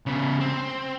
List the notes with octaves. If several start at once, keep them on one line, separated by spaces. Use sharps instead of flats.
C#3 B3
C4